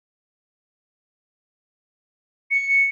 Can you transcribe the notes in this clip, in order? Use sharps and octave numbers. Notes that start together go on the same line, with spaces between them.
C#7